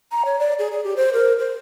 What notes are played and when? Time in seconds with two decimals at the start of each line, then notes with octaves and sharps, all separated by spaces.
0.12 A#5
0.25 C#5
0.39 D5
0.59 G#4
0.72 G#4
0.84 G4
0.96 C5
1.13 A#4
1.39 C5